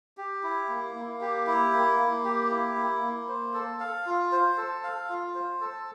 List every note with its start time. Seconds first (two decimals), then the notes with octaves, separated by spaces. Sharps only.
0.17 G4
0.43 E4
0.69 A#3
0.95 A#3
1.21 G4
1.47 E4
1.73 A#3
1.99 A#3
2.25 G4
2.51 E4
2.76 A#3
3.02 A#3
3.29 C5
3.54 A4
3.80 F5
4.06 F4
4.32 C5
4.58 A4
4.84 F5
5.09 F4
5.35 C5
5.61 A4